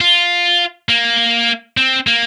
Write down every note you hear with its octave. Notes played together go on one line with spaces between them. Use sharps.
F4
A#3
C4
A#3